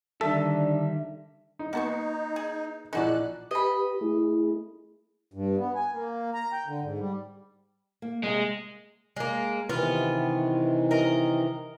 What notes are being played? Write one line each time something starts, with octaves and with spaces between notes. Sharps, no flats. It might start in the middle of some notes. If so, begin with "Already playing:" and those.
D3 D#3 G3 D4 A4 E5
D#4
A#3 B3 D#4 F#4 A5 C#6
G#4
A#1 E3 D#4 F#4 G#4 D5 F#6
G4 B4 D#5 B5
A3 E4 G#4
G2
B3
G#5
A#3
A#5
G5
D3
G#2
G3
A#3
C3 G#3 A#3
G#3 A#3
C3 D#3 E3 B3 F4
A#4 D#5